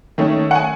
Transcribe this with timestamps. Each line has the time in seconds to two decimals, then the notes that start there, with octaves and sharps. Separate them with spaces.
0.18 D#3 A3 C#4
0.51 F#5
0.55 G#5